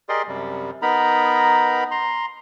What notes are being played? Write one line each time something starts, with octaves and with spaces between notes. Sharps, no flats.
G4 G#4 A#4 D5 D#5 C6
F#2 C3 G3
B3 D#4 A#4 A#5 B5
A#5 C6